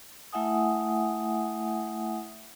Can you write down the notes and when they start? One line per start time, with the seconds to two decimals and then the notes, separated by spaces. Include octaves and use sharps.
0.32 A3 E4 E5 F#5 G#5 D#6